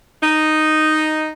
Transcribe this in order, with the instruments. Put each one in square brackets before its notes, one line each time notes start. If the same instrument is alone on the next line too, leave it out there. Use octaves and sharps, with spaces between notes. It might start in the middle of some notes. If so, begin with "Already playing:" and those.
[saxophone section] D#4